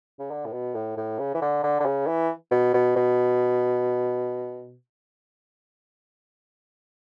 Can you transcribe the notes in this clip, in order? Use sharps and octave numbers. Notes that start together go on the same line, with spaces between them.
C#3
D3
A2
B2
A2
A2
C#3
E3
D3
D3
D3
C#3
E3
B2
B2
B2